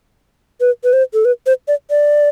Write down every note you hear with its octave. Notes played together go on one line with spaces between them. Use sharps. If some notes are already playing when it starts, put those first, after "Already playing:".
B4
B4
C5
A4
B4
C5
D5
D5